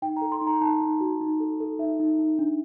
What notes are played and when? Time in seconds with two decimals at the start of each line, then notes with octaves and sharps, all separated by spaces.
0.02 D#4 G5
0.17 A4 A#5
0.32 C6
0.41 D#4
0.47 A#5
0.61 D#4 A5
0.81 D#4
1.01 F#4
1.21 D#4
1.40 A4
1.60 A4
1.79 D#4 E5
2.00 D#4
2.19 D#4
2.39 D4